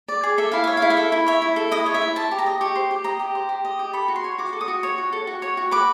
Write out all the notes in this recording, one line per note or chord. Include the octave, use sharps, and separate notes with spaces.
D5
G#4
A4 E5
E4 F5
C#5 E5
E4 F5
E5
A4
E4
C#5 E5
E4
A4
E4 D#5
C#5
E5
E4
C5 A5
G4
A#5
D#5
G4 C#6
C5
G4
D#5 A#5
G4
C5
G4
D#5
G4
A4 B5
F#4
C6
C#5
F#4 D6
A4
D#6
F#4
C#5
F#4
A4
F#4
C#5
F#4
B4 D6